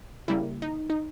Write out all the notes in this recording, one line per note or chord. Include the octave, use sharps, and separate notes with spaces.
C#3 G3 A#3 E4
D#4
D#4